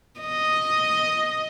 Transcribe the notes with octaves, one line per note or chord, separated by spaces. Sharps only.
D#5